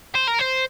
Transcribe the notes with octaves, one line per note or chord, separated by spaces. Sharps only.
C5
A#4
C5